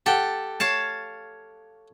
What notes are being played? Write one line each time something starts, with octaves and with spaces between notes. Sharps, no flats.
G4 A4 F#5 G5
C#5 F5 A5